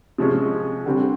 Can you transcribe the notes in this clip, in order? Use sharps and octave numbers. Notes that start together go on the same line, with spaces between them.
C3 F3 G#3 C#4
D3 G3 C4